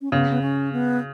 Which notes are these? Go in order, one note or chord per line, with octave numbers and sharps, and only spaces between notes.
C#4
C#3 B3
B3
C#4
B3